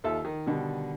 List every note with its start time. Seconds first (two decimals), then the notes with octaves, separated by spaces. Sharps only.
0.04 D#2 F4 A4 E5 E6
0.25 D#3
0.46 B2 D3 D#3 G3